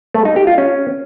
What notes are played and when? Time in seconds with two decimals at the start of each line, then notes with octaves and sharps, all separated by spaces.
0.14 A3
0.25 D#4
0.36 G4
0.47 F4
0.58 C#4